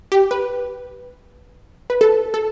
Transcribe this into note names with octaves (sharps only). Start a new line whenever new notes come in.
G4
B4
B4
A4
A4